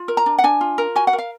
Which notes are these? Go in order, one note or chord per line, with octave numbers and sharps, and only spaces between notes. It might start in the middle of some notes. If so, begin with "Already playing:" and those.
Already playing: F4
A#4
A#5
D4
F#5
D4 G#5
F4
A#4
F#4 G#5
F#5
A#4
F5